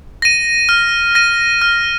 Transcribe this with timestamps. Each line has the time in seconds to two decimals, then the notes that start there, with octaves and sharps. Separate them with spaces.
0.22 A#6 D#7
0.69 F6
1.15 A#6 D#7
1.62 F6